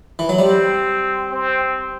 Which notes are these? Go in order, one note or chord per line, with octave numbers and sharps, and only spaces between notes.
E3
F#3
G3 C4
C4